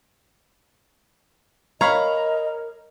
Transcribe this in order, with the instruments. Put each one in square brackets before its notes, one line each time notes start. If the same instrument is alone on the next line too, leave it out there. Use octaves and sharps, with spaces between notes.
[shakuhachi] A#4 [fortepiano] C#5 F5 B5 [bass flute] D#5 [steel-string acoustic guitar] A#5